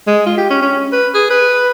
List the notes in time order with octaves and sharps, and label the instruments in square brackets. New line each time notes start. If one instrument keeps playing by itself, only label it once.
[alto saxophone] G#3
F4
G4
C#4
C#4
B4
G#4
B4